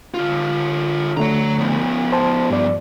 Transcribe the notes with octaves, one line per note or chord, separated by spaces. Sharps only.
D3 F4
D3 A3 C#5 A#5
F3 B3
C5 A5
G2 D5